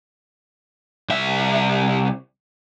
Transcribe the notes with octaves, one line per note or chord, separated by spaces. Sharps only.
C2 E5